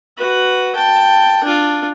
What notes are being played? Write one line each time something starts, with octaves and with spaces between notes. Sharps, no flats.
F#4 B4
G5 A5
D4 F4